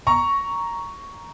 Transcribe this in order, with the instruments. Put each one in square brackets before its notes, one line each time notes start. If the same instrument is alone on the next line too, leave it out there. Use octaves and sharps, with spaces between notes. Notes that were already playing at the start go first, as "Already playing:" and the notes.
[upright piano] A#5 C#6